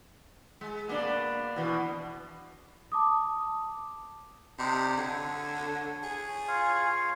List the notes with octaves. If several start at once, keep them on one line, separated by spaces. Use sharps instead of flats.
G#3
B2 A#3 D4
B2 E3
A5 D6 D#6
C3 D4 D#4 C5
D3 C#5
G#4
F4 C#5 F5